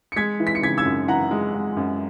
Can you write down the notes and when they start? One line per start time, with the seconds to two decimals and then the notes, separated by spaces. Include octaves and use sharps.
0.12 C#7
0.16 G#3 G#6 B6
0.40 E3
0.47 B6
0.55 C#7
0.62 C#3 G#6 B6
0.78 E6 G#6
0.85 F#2
1.08 E3 F#5 A#5
1.31 G#3
1.55 G#3
1.77 F#2